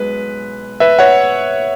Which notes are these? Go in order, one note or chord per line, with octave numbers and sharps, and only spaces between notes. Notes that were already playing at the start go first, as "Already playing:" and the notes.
Already playing: B1 G#3 B4
B4 E5
C#5 F#5